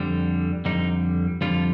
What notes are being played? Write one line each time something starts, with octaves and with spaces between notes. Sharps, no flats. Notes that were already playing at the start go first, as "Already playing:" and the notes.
Already playing: F2 D3 G3
F2 D3 G3 D#4
F2 D3 G3 F4